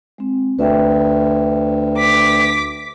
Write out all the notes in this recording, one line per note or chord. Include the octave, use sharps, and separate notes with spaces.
G#3 C4
D2 B4 E5 G5
D6 B6